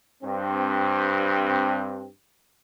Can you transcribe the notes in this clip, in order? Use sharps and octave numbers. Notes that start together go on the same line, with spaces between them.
G2 C4